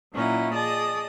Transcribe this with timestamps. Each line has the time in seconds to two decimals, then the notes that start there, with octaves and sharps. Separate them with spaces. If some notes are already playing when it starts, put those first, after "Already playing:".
0.13 A#2 F#3 C#4 D#4 E4 F#5
0.54 G#4 D5 D#5 A5 D#6